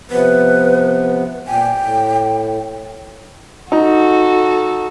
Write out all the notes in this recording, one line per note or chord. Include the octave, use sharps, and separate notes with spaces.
C3 F3 B3 B4
A#2 G5 G#5
A2
D#4 F#4 A4